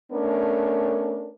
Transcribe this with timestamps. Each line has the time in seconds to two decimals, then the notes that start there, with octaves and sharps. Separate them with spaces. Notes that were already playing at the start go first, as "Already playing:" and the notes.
0.12 A3 B3 C#4 D4 A#4